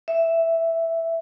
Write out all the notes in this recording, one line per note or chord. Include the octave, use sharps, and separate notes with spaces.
E5